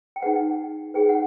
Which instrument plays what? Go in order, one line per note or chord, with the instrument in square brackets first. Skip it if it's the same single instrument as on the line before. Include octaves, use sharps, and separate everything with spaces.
[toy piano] G5
D#4 G#4 B4 F#5
D#4 G#4 B4 G5
F#5